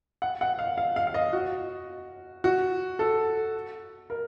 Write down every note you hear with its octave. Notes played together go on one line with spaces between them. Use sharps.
F#5
F#5
F5
F5
F5
F5
D#5
F#4
F#4
A4
A#4